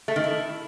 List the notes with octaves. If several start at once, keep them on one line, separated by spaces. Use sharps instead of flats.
A3
D#3
E4